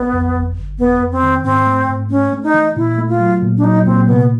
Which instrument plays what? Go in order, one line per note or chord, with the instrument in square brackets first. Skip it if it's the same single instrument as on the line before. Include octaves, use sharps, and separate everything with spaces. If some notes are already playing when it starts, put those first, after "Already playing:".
Already playing: [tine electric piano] A#1 [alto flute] B3
[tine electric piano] F2
G1
G1
[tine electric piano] F2 [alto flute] B3
[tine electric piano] F2
[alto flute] C4
[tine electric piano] D#3
[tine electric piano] G#2 [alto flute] C4
[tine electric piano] A3
G#2
[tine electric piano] A3 [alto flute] C#4
[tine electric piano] A3
[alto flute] D#4
[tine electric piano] E3
[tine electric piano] A#2 [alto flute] E4
[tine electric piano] A3
[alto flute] F4
[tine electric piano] F#3
A#2
[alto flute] D4
[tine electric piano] F#3 [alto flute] D#4
[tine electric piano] A#2 [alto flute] C4
[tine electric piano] C3 [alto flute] B3